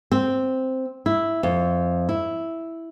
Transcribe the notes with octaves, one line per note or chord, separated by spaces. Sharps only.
C4
E4
F2
E4